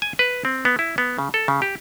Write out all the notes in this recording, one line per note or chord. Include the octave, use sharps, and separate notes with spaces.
G#5
B4
C4
B3
E4
B3
C#3
A4
C#3
G4